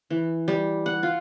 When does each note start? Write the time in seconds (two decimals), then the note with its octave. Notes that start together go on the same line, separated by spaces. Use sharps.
0.10 E3
0.48 G3
0.86 F#5
1.03 F4